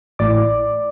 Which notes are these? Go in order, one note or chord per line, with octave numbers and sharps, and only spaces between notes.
A1 A2 A3 E4 D5 D6